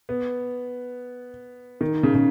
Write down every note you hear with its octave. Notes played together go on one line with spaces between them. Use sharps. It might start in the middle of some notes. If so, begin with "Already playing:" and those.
B3
D#3
C#3
C#3